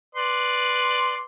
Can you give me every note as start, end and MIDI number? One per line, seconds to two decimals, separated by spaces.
0.15 1.25 71
0.15 1.25 74
0.15 1.25 84